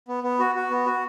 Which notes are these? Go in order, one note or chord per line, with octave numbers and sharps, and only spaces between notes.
B3
B3
F#4
F#4
B3
F#4